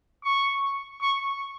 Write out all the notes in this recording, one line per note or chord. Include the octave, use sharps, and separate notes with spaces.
C#6
C#6